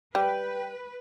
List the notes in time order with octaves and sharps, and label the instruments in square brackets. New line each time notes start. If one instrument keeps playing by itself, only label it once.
[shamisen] G3 [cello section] B4 [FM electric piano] G5